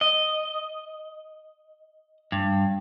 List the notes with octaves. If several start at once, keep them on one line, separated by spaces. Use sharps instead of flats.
D#5
G2